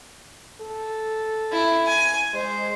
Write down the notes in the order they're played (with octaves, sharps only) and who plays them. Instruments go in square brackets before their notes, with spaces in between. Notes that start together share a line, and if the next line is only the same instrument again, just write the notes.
[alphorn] A4
[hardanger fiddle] E4
G#5
[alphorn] G#3 [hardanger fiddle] C5